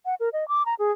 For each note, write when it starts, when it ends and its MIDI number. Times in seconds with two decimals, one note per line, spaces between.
0.06 0.15 78
0.20 0.29 70
0.33 0.47 75
0.48 0.63 86
0.66 0.74 82
0.79 0.92 68